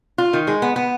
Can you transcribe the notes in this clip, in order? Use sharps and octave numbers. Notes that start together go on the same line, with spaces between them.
F4
D#3
G#3
B3
B3